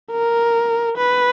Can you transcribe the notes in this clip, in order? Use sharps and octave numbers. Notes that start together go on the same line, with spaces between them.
A#4
B4